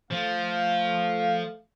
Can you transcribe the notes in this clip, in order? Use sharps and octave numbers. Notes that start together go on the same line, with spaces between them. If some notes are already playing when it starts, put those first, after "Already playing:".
F3 A3 F5